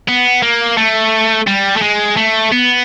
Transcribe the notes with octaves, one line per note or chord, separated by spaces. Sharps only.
B3
A#3
A3
G3
A3
G#3
A3
B3